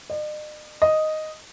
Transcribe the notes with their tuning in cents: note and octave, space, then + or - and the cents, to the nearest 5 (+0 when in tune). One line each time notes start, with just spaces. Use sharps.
D#5 -45
D#5 +0